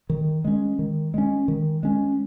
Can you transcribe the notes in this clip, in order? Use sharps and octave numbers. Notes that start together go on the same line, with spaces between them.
D#3
G#3 C#4
D#3
G#3 C#4
D#3
G#3 C#4